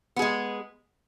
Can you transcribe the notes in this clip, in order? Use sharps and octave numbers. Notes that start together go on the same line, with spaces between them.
G#3 B3 G#4